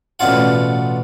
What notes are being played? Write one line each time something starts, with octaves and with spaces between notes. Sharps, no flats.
A1 B2 D4 F4 F#5